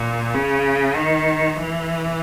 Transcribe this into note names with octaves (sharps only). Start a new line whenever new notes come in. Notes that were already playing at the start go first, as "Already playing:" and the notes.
Already playing: A#2
C#3
D#3
E3